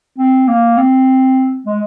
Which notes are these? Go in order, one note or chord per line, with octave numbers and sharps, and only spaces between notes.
C4
A#3
C4
G#3